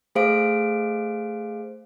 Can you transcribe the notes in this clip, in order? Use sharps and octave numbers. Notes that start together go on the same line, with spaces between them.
A3 G#4 C5 F5 D7